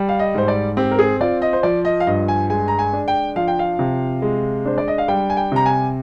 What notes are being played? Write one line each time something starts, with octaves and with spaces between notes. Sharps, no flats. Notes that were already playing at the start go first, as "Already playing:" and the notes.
Already playing: G3
F5
D#5
G#2 C5
D5
C4 G4
A#4
G#4
F4 D5
D#5
C5
F3 D5
D#5
F5
G2 D#5
G#5
G#3 G#5
A#5
G#5
D4
G5
F3 F5
G5
F5
C3
G#3
D4 C5
D5
D#5
F5
G3 G5
G#5
G5
C3 A#5
G#5